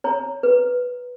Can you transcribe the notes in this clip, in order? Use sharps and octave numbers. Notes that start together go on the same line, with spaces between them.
C#5 A#5
B4